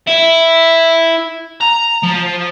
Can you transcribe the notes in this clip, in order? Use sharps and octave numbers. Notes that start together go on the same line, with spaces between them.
E4
A#5
F3